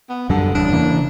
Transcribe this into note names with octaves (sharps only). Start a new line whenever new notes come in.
B3
F#2 D3 F#3 G3
F#1 E2 C#3 D4
C#3 E3 A#3